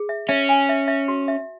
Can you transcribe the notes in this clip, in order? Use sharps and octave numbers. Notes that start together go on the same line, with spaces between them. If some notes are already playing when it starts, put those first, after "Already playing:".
Already playing: G#4
E5
C#4 E5
G#5
E5
E5
F#4
E5